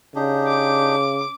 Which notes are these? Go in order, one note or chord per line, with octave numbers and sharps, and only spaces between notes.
C#3 D4 D#4 G4
D6